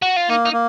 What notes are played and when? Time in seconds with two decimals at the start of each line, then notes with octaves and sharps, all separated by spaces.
0.02 F#4
0.16 F4
0.29 A#3 D#4
0.46 D#4
0.53 A#3